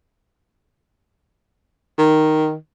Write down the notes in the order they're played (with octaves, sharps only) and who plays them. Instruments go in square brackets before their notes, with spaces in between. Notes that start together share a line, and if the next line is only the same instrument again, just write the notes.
[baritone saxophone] D#3